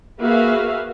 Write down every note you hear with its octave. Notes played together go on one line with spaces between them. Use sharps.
A#3 F#4 G#4 B4 E5 F5